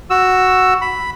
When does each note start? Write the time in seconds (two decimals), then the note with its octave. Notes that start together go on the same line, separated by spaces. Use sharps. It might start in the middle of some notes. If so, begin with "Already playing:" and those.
0.10 F#4 E6
0.81 B5